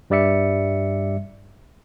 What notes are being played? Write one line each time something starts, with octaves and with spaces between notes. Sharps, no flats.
G2 G3 D5 E5 C#7